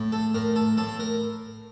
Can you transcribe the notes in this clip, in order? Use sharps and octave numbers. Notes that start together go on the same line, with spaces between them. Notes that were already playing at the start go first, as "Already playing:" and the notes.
Already playing: A2
A4
A2 A#4
A4
A2 A4
A#4